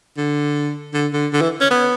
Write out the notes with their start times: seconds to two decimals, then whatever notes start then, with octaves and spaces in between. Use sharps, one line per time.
0.18 D3
0.94 D3
1.13 D3
1.33 D3
1.42 E3
1.61 C#4
1.71 B3